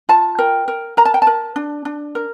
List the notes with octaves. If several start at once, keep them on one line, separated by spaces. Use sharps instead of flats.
F4 A5
A#4 G5
A#4
A#4 A#5
A5
G5
A5
A#4
D4
D4
A#4